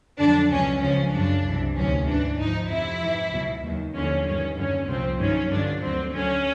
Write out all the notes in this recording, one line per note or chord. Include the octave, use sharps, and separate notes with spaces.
F2 D3 F#3 D4
C#2 B2 F#3 C#4
C#2 C#3 F3 C#4
F#2 C#3 F#3 D4
C2 C3 E3
D2 C3 D#3 F#3 C#4
G#2 E3 D4
G#2 F3 D#4
F2 C3 F3 E4
G#2 E3
C#2 B2 F#3
D#2 D#3 F#3
D#2 D3 F3 C#4
G2 D#3 F#3 C#4
F#2 D3 F#3 C#4
C2 A#2 F3 C4
G2 D#3 F#3 C#4
G2 D3 F3 D4
D2 D3 F#3 C4
D2 D3 F#3 C#4